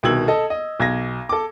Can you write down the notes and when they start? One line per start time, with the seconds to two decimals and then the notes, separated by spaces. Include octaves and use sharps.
0.03 C2 B2 D#3 E6 G#6 F#7
0.28 A4 D#5
0.50 D#5
0.80 B1 G#6 A#6
1.29 A4 D6